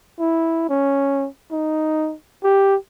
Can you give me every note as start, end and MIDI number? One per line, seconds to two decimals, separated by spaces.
0.19 0.66 64
0.69 1.28 61
1.52 2.14 63
2.43 2.76 67